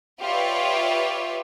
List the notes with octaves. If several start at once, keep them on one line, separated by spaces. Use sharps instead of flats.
F4 G4 B4 C#5 D5 E5